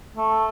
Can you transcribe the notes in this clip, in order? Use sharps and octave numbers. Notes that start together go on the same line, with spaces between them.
A3